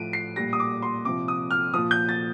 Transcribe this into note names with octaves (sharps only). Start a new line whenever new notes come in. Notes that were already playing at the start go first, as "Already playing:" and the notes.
Already playing: A2 F3 D7 D#7
C7
A#2 G3 A#6
D#6
D6
C6
C3 F3 D6
D#6
F6
A#2 F3 D#6
G6
A6